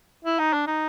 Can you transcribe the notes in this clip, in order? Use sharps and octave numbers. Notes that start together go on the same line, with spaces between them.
E4
D#4
D4
D#4